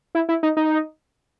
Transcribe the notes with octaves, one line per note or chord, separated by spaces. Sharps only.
E4
E4
D#4
D#4